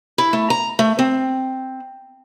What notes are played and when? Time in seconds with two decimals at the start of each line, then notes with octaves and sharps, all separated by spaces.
0.18 E4
0.33 A3
0.50 A#5
0.79 A3
0.99 C4